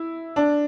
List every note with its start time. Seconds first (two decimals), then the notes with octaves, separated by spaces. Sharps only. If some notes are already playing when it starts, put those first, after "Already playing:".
Already playing: E4
0.36 D4